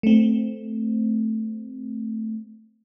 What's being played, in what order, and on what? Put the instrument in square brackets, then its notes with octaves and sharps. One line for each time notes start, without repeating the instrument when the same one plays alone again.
[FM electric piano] A3 C4